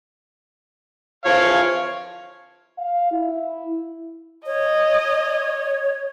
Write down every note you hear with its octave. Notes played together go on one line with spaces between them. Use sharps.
E3 F3 C#5 F5
F5
E4
C#5 D#5